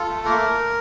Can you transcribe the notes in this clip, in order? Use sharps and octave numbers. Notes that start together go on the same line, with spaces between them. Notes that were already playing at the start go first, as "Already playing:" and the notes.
Already playing: F4 A4
A3
A#3 A#4